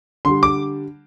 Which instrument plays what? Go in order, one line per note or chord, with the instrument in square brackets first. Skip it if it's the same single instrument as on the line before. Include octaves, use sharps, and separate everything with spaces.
[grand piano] D3 G3 C6
D6